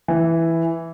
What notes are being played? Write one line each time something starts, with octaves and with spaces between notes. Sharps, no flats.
E3